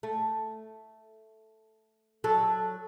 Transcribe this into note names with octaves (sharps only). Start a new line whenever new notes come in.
A3
F#3 A4